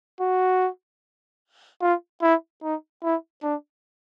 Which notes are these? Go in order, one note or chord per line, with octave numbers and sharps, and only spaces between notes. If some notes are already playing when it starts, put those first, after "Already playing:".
F#4
F4
E4
D#4
E4
D4